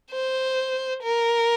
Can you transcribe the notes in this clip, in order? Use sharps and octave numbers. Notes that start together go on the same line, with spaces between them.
C5
A#4